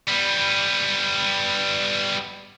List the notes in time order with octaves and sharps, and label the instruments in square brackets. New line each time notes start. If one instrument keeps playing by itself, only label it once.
[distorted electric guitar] G3 B3